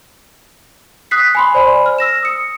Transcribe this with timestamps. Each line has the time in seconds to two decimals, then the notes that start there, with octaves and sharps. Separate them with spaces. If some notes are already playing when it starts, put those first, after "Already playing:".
1.11 D#6 F#6 B6 C7
1.35 G#5 B5 C6
1.54 C5 D5 G#5 B5
1.86 F6
1.98 E6 A#6 E7
2.23 D#6 C#7